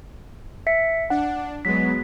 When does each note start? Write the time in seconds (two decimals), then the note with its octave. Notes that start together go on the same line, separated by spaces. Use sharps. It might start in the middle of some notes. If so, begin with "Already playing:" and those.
0.67 E5 B6 C#7
1.10 D4 F#5
1.65 F#3 G#3 B3 B6